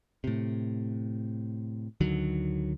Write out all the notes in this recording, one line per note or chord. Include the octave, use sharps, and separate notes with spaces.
A2 C3
D2 D3 D#3 F#3